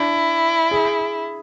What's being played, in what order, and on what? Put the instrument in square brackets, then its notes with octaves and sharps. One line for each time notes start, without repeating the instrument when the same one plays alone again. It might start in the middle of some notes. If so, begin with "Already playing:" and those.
Already playing: [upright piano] D4 [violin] E4
[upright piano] G#4